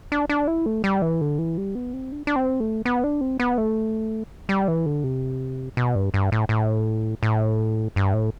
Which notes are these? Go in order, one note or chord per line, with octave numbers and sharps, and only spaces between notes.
D4
D4
E4
A3
G3
E3
D3
E3
G3
B3
C4
D4
D4
C4
A3
B3
D4
C4
B3
A3
G3
E3
D3
C3
B2
G2
G2
A2
A2
A2
G2
A2